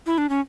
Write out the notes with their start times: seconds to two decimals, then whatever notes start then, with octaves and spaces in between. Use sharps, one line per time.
0.06 E4
0.18 D4
0.29 C#4